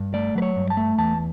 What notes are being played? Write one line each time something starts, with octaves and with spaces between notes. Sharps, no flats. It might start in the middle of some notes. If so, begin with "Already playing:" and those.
Already playing: G2
A3 D5
F#3 B4
C#5
G2
A5
A3
E2 A5